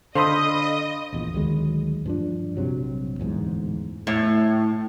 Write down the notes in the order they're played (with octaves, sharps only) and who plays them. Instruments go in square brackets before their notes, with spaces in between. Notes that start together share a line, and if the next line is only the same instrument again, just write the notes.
[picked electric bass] D3 [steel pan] A4 C5 [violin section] D#5 [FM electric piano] F5 B5 D#6
[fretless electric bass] A#1 E2 A#2
D2 D#3 F#3 G#3
G2 F3 D4
A#1 G2 C3 F#3
D1 E2 G#2
[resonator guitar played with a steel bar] A2